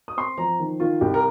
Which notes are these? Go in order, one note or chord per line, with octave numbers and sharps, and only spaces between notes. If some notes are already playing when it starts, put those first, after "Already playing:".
D#6
C4 C6
F3 A#5
D#3
D#3 F4
C2 G4
A#4